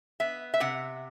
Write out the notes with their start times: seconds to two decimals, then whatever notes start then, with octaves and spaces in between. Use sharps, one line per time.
0.20 B3 E5
0.54 E5
0.60 C3 F#5